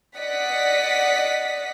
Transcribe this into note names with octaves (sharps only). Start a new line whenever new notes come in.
D5 D#5 F#5 B6